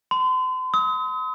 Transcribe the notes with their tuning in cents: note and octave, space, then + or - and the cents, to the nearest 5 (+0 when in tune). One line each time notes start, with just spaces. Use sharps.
C6 -40
D#6 +40